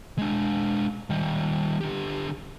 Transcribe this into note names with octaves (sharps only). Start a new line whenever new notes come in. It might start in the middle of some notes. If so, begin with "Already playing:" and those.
G#3 D4
D#3 G3
D3 G4